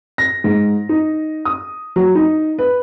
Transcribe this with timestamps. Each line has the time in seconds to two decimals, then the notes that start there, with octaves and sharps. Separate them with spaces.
0.18 A#6
0.44 G#2
0.89 D#4
1.45 D#6
1.96 F#3
2.15 D#4
2.59 B4